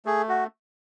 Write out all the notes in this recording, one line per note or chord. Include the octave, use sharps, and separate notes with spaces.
A3 G#4
F#4